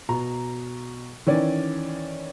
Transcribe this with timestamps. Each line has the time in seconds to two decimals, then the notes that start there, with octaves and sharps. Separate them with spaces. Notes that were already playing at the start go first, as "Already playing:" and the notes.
0.09 B2 A#5
1.27 D#3 E3 C#4 D5